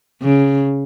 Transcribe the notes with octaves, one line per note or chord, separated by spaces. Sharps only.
C#3